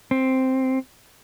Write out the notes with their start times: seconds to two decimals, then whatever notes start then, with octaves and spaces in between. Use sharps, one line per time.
0.11 C4